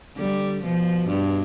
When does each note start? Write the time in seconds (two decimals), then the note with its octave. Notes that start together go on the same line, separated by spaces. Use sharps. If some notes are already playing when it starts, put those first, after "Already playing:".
0.18 D3 G3
0.63 B2 F3
1.08 G2